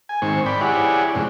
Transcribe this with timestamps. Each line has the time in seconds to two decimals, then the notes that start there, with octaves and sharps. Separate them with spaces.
0.09 G#5
0.22 G#2 D#3 C4 C#6
0.46 D5 G5 B5
0.61 E4 G4 G#4 C#5 D5 F#5
1.15 F2 G#2 C3